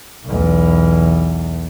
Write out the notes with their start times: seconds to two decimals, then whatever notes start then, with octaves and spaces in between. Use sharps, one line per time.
0.25 B1 E2